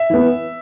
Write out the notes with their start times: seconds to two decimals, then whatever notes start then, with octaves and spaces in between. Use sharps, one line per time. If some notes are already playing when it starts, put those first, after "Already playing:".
Already playing: E5
0.10 E3 B3